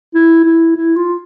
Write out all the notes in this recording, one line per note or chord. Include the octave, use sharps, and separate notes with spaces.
E4
E4
E4
F4